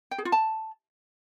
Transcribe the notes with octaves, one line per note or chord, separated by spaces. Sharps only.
G5
G#4
F4
A5